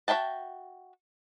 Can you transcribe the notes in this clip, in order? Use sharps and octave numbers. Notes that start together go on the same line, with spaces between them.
F#4 C5 E5 G5 A5